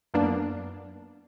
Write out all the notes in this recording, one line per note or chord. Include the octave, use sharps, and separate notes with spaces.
F#2 A#3 B3 D4